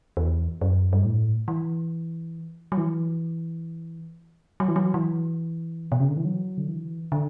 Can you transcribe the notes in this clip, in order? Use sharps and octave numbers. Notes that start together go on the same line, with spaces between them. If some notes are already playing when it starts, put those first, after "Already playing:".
E2
F#2
G2
A2
E3
F#3
E3
F#3
E3
F#3
E3
B2
C#3
D3
E3
F#3
D3
E3
D3